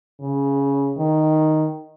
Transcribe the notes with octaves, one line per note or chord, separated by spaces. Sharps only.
C#3
D#3